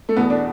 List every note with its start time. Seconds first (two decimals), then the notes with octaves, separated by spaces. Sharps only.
0.09 A3
0.16 E2 B2 B3
0.30 D4